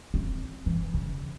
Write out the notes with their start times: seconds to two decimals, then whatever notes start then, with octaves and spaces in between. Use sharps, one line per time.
0.14 C4
0.66 E3
0.94 C#3